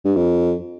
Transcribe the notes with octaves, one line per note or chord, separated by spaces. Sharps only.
G2
F2